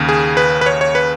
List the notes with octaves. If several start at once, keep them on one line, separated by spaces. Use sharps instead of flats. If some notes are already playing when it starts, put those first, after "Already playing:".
Already playing: D#2 C#3
G#4
B4
B4
C#5
C#5
B4